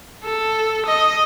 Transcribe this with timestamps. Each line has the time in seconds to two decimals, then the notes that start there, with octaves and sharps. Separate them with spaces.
0.25 A4
0.86 D#5